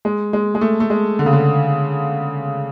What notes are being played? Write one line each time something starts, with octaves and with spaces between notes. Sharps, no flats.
G#3
G#3
G#3
A3
A3
G#3
D3
C#3
D3